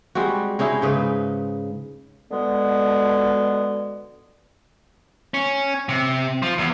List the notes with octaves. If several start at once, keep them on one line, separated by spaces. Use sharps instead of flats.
G3 G#3 C4 F#4
G#3 C#4 D#4 E4
G#2 C#3 D#4 B4
B2 D3 G#3 B3
C#4
C3
F3
E2